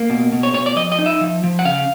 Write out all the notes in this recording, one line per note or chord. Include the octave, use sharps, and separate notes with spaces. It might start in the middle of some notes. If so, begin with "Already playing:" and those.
Already playing: A#3
B2
B2
C#5
B2 C#5
D5
F3 D#5
D#5
D#4
E5
F3
F3
F#5
C#3 F5